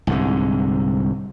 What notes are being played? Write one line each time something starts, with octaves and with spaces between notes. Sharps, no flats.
C2 G#2 D3